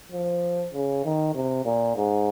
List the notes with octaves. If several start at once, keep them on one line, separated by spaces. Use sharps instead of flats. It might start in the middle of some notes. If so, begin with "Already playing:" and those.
F3
C#3
D#3
C3
A#2
G#2